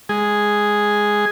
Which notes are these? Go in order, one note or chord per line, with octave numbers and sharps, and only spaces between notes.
G#3 G#4